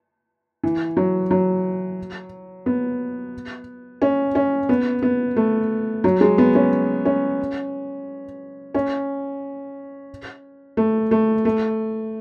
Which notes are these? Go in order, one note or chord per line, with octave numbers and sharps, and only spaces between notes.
E3
F#3
F#3
B3
C#4
C#4
B3
B3
A3
F#3
G#3
B3
C#4
C#4
C#4
A3
A3
A3